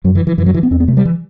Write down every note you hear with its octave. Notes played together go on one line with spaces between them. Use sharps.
F#2 F#3
E3
E3
F#2 E3
F#3
E3
B3
E2 C4
B3
C3 A3
G3
E3